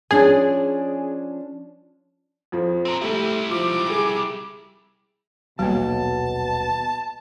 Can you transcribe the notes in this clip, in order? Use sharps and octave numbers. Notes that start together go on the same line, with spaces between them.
F3 C#4 D4 G#4
F2 F3
C4 A#4
G3 A3 E4 G4
F3 D6
G#4
D#1 B1 B2 F#3 G3 A#3 A5